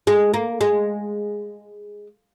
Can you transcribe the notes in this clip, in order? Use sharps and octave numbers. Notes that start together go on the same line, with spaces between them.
G#3
A#3
G#3